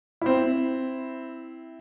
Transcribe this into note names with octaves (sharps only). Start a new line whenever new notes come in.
C4 E4